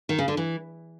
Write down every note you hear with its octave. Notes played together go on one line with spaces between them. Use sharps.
D#3
C#3
D3
E3